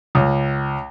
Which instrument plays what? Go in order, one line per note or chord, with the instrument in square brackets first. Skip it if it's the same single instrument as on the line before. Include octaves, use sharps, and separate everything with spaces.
[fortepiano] C#2